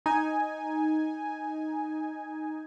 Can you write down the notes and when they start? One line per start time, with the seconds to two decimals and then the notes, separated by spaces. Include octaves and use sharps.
0.06 D#4 G#5